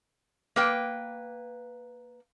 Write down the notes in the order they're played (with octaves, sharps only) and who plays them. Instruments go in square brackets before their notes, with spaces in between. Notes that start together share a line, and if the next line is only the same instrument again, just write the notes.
[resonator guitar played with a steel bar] A#3 B4 G5